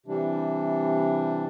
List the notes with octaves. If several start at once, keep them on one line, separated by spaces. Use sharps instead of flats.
C3 E3 G3 D4